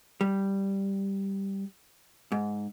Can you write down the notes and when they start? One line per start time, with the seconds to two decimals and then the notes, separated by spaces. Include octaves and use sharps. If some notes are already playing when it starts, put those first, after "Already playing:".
0.21 G3
2.32 G#2